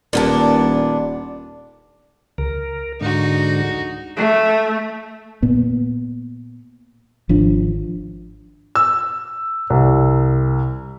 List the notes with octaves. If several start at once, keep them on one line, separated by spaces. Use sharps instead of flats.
D#1 A#2 B3 D4
C#2 A#4
G#2 D3 D#4 F#4
A3
A#2 B3
G#1 F3 D4
E6
C2